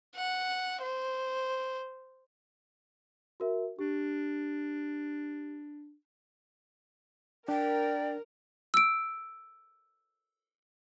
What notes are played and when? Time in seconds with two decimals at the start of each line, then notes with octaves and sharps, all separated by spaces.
0.15 F#5
0.82 C5
3.40 F#4 A#4 E5
3.79 D4 G4
7.48 D4 A#4 D5 G5
8.74 E6 D7